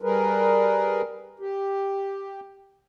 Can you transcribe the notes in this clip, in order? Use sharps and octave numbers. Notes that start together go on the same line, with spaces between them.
G3 G#4 A#4 B4
G4